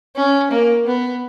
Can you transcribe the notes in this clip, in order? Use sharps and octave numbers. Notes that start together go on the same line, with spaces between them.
C#4
A#3
B3